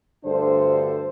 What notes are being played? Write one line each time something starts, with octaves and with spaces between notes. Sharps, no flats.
D2 G2 D3 D4 A4 C5